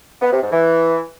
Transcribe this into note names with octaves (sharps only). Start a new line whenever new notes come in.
B3
C3
G#2
E3